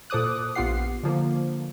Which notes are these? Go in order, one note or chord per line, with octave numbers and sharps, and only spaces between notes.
A#2 A4 C5 D6 D#6 F#6
A#1 B3 F4 G4 F#5 C7
D3 F3 A#3